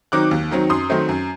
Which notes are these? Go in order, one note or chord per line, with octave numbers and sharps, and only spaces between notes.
D#3 F#3 C4 D#4 D6 F#6
D#2
D#3 F#3 C4 D#4
F#2 C6 D#6
D#3 F#3 A3 C4
F#2